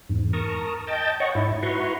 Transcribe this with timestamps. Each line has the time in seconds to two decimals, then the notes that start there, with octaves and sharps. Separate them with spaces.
0.09 E2 G#2
0.33 A#4 A5 A#5 C#6 D#6
0.87 D#5 G5 A5 G6 A6
1.20 C#5 D#5 F#5 C#6
1.35 G#2 E4
1.63 E4 F#4 B4 A#5 C6 C#6